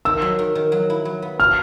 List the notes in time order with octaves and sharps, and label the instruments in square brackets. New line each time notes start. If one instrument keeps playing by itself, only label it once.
[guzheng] D#3 [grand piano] E6
[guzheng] F#3
D#3
D#3
F#3
E4
F#3
B3
[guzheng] F#4 [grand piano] F6